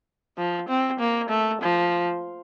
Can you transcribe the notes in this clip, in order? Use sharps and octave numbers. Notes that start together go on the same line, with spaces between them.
F3
C4
A#3
A3
F3